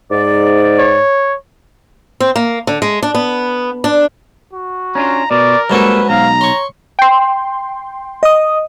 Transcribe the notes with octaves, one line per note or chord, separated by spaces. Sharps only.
G#2 D5
C#5
C4
A#3
D3
G#3
D4
B3
D4
F#4
C#4 D4 F4 A#5
B2 A#4 D5
G#2 F#3 G3 A#3 C#4 A4 B4
B1 F5 A#5
C#5 C6 C#6
G5 C6
D#5 D#6